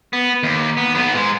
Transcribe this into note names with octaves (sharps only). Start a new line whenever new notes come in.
B3
D#2
B3
F#3 B3
G#2 G#3